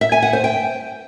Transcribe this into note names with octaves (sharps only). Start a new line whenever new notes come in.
E5
G#5
F#5
C5
G5